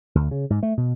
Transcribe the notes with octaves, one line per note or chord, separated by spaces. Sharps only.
D2
C#3
G#2
A3
B2